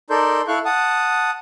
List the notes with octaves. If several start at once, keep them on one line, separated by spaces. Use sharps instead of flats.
D#4 A4 A#4 D5 C6 G6
E4 A4 F5 C#6 F#6
F#5 A5 D#6